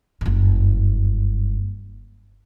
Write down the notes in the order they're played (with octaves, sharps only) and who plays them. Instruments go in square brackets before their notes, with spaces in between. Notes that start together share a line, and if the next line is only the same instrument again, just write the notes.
[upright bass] F#1 G2